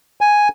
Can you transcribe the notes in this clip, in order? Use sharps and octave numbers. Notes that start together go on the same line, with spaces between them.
G#5